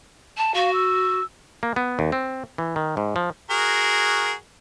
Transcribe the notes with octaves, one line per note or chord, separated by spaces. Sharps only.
A5
F#4 F5
E6
A#3
B3
D#2
C4
E3
D#3
G#2
F3
F#4 G#4 A#4